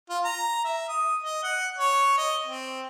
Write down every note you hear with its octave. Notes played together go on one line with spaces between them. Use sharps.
F4
A#5
E5
D#6
D#5
F#5
C#5
D#5
C4